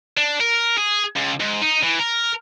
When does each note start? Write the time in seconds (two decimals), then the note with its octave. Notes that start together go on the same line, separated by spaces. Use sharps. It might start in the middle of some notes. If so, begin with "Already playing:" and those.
0.17 D4
0.41 A#4
0.78 G#4
1.17 C#2
1.41 G#2
1.62 D#4
1.83 E3
2.00 A#4